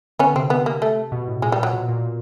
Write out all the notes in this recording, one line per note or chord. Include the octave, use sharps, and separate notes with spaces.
D3 B3 C#4
C3 C4
B3
A#3
A3
B2
A2
A#2 G#3
G3
F#3
B2
A#2